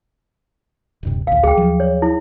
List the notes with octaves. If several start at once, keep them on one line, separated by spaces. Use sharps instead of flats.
D#1 G2 C3
A1 D2 F5
C#2 G#4 G5
D#2 F3 F#3
C#5
E4